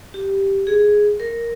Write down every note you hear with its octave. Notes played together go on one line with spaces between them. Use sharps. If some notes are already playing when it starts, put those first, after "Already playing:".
G4
G#4
A#4